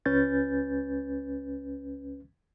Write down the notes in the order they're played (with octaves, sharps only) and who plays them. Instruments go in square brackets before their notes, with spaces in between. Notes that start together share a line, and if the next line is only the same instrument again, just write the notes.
[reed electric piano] C#2 C#4 B4 G6 A6